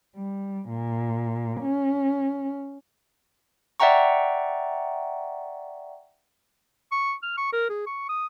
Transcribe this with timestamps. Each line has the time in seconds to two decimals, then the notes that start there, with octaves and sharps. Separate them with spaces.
0.16 G3
0.69 A#2
1.62 C#4
3.80 D5 E5 F#5 G5 A#5 C#6
6.92 C#6
7.23 F6
7.38 C#6
7.53 A#4
7.69 G#4
7.87 C#6
8.09 D#6